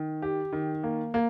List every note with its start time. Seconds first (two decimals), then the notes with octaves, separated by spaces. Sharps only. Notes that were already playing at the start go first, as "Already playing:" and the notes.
Already playing: D#3
0.22 G4
0.53 D#3
0.84 A#3
1.14 A#3